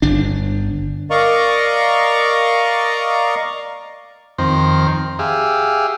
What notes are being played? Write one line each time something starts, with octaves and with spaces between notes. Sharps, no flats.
G1 D4
A#4 D5 D#5 F5 A#5 C#6
F2 D#3 C4 C5 A#5
G4 G#4 E5 F5